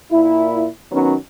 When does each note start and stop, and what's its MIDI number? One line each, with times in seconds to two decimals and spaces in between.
0.12 0.66 46
0.12 0.66 64
0.92 1.14 51
0.92 1.14 54
0.92 1.14 59
0.92 1.14 61